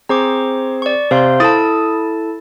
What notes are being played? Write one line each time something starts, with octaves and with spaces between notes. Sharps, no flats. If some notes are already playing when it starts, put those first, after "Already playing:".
C4 G#4 C5 A#5 C#6 D6
D5 C#6
C3 C5 F5 C6
E4 A4 A5 D#6 A6